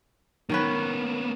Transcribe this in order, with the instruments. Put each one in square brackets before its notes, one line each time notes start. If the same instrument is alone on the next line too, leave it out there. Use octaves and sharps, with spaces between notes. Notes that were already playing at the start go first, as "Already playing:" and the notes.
[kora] D#3 C#4 B4 [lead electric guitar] A#3 B3